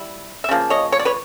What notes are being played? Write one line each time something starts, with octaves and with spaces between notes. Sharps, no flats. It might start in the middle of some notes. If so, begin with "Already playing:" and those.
Already playing: G3 E4
E5
C#3 F3 A#3
C#5 D#5
C#5
D5
B4 C#5